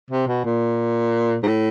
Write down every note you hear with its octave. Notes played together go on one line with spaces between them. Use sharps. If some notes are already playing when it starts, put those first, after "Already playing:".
C3
B2
A#2
G#2
A2